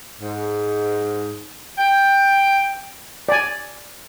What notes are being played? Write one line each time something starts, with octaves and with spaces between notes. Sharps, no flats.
G#2
G5
D5 G#5